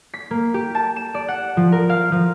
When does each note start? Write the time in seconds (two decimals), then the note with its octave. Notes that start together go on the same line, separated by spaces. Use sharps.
0.14 B6
0.31 A#3
0.54 G4
0.75 A5
0.96 E7
1.14 D5
1.28 F#5
1.57 F3
1.72 A#4
1.89 F5
2.12 F3